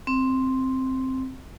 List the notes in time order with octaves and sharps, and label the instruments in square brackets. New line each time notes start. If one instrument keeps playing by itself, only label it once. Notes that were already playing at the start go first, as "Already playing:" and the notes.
[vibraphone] C4